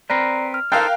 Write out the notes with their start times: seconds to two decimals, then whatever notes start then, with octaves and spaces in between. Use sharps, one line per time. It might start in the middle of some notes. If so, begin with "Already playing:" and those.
0.10 C4 A#4 B4 D5 A#5 C7
0.54 F6
0.72 D#4 A4 A#4 C5 F5 G5 F#6